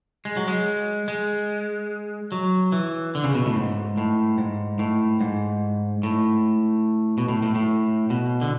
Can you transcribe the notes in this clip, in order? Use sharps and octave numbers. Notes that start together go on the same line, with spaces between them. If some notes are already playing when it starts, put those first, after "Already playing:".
G#3
F#3
G#3
G#3
F#3
E3
D3
C#3
B2
A2
G#2
A2
G#2
A2
G#2
A2
B2
A2
A2
A2
B2
D3